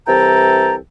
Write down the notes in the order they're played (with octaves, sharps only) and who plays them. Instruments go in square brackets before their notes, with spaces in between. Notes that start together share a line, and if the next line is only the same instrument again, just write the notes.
[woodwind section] C2 C3 E3 A4 G5 A#5